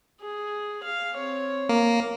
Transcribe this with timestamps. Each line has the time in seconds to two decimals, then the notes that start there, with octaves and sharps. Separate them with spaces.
0.21 G#4
0.83 F5
1.15 C4 C#5
1.69 A#3